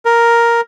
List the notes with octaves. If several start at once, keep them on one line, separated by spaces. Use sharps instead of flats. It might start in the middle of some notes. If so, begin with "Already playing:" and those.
A#4